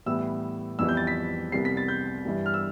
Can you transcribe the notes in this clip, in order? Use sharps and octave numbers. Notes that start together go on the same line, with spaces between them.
A2 E3 G3 B3 E6
F2 E3 G3 B3 E6
G6
A6
B6
C2 C3 G3 B3 C7
B6
A6
G6
G2 E3 G3
F6
E6